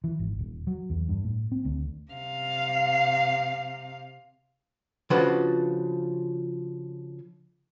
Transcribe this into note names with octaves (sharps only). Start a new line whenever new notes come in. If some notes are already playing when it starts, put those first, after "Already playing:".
E3
G#1
D#1
F#3
E2
G2
A2
C4
D2
C3 F5
C#3 F3 D4 F4 F#4 B4